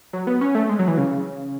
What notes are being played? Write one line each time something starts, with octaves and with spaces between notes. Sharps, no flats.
F#3
B3
C#4
A3
G#3
F#3
E3
C#3